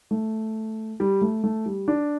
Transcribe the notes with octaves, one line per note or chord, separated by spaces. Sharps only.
A3
G3
A3
A3
G3
D4